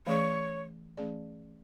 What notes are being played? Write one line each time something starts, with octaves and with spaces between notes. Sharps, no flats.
E3 A3 C#4 G#4 C#5 D5
E3 A3 C#4 G#4 D5